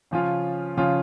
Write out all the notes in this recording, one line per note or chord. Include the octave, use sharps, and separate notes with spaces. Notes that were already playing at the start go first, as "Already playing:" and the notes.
C#3 F3 C#4 F4
C#3 F3 C#4 F4